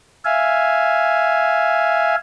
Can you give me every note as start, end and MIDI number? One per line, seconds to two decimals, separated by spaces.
0.25 2.16 76
0.25 2.16 77
0.25 2.16 80